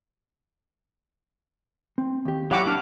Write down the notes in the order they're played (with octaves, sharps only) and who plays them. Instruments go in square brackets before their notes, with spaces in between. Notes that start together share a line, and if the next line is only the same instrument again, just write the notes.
[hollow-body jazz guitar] C4
D#2 G4
[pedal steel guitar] F#3 E4 F#4 [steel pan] G4 F#5 D6 [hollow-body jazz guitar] F5
[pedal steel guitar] A#3 D4 F6